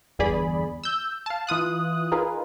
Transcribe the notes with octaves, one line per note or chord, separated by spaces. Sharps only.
G1 E2 G2 G#4 D5 B5
E6 G6
F5 A5
E3 F4 D#6 F#6
D#4 F4 G#4 A#4 B4